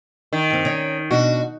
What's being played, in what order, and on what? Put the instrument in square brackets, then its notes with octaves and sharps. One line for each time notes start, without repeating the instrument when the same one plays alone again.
[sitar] D#3
[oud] G2 C4
C#4 D#4 D5
[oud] B2 D4 [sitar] F#4